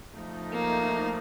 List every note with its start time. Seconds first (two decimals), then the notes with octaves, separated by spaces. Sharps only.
0.15 F3 A3 D#4
0.52 A#3